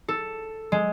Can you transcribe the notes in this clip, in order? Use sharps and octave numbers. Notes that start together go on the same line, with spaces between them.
A4
G#3